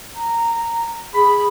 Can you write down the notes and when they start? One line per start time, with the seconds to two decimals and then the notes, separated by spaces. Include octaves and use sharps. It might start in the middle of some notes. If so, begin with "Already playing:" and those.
0.15 A#5
1.14 G#4 B5